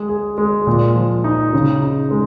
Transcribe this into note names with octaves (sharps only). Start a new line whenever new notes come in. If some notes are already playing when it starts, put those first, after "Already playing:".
Already playing: G#3
G#4
G#3
A#2
F3
D#4
C#3
D#4
G#3